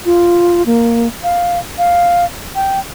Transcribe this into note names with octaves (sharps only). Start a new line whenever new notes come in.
F4
A#3
F5
F5
G5